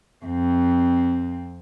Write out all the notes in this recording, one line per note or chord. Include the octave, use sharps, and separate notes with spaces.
F2 C4